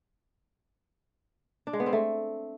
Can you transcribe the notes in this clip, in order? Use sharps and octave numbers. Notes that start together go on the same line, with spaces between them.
D4
G#3
B3
C4
A3